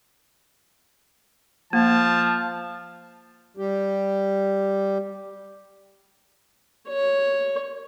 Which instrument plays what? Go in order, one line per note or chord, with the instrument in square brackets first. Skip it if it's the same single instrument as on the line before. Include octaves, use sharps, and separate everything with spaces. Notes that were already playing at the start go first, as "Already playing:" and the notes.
[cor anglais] F3 [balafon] A#3 [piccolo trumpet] A5
[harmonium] G3 G4
[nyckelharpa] C#5